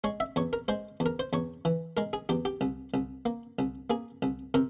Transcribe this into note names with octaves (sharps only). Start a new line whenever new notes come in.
G#3 C#5
E5
E2 C#5
A#4
G#3 C5
E2
A#4
C5
E2 C#5
E3
G#3 A#4
G#4
E2 G4
G4
C2
C2
A#3
C2
A#3 G#4
C2
C3 A#4